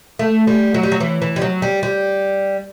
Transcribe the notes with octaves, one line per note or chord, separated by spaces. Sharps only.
A3
G3
F#3
G3
F#3
E3
E3
G3
F#3
G3
G3